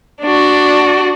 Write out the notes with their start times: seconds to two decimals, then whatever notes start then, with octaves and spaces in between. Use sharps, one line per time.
0.22 D4 F#4